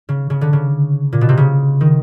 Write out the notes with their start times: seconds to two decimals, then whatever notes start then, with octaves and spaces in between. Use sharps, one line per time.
0.09 C#3
0.30 C#3
0.41 D3
0.53 C#3
1.13 A#2
1.21 B2
1.29 C3
1.37 C#3
1.81 D#3